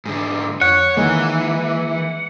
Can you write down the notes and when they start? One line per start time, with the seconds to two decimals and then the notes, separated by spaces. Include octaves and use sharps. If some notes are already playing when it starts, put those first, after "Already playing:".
0.06 G#2 D3
0.61 F2 C#5 F#5
0.97 D#3 E3 G#3 A#3